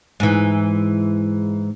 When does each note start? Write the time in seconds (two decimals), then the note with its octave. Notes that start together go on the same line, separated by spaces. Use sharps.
0.20 G#2 E3